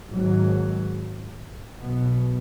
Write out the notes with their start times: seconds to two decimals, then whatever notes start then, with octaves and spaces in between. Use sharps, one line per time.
0.11 G#1 G#2 F#3
1.78 B1 B2 B3